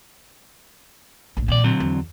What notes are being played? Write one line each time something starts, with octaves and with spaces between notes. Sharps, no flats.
A#1 A2
F2 A#2 D#3 D5
D3 F#3 C4
E2